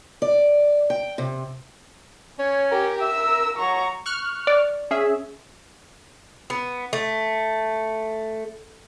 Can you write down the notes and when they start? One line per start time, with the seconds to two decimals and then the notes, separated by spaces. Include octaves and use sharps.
0.22 D5
0.90 G5
1.18 C3
2.39 C#4 C#5
2.71 G4 A#4 G5
3.02 E5 E6
3.58 F#3 A#5 C#6
4.06 C#6 F6 F#6
4.47 D5
4.91 C#4 G#4 E5
6.50 B3
6.93 A3